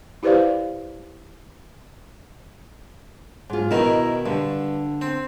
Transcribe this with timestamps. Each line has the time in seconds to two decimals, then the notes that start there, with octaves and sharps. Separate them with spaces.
0.23 E4 G4 B4 C5 D5 F5
3.50 G#2 F4
3.71 B2 D#3 E4 A#4
4.26 G2 D3
5.01 C4